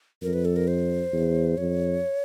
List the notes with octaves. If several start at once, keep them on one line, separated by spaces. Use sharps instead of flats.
F2 A#4
B4
A4
A#4
C5
E2
F2 C#5